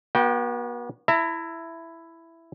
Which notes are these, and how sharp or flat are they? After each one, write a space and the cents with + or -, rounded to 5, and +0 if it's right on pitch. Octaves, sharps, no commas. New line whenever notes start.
B3 -45 F#4 +0 G5 +0
E4 +10 E5 +10 A#5 -35